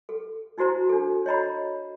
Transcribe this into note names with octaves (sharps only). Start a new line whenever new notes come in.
A4
D#4 E4 F#4 C5 A#5
D4 A4
C#5 D#5 A#5 B5